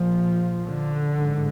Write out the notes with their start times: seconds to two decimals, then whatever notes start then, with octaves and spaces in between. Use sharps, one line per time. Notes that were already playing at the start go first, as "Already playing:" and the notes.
Already playing: A#1 A#2 F3
0.67 D3
1.16 A1 G#2